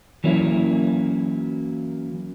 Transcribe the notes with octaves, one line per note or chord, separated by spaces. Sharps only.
E3 F#3 A#3 C#4 E4